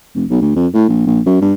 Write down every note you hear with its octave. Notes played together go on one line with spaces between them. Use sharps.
F1
B1
D2
F2
A2
A#1
A#1
F#2
G2